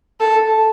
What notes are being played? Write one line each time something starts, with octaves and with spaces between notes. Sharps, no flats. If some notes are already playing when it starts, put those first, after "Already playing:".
A4